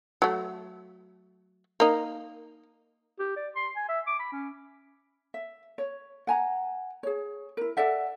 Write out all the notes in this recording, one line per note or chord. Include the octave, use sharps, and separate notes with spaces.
F#3 A3
A#3 D#4
G4
D5
C6
G#5
E5
D6
B5
C#4
E5
C#5
F#5 G#5 A#5
G#4 C#5
E4 A#4
A4 D5 E5 F#5